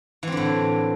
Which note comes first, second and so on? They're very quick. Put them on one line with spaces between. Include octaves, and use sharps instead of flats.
E3 C4 D3 A2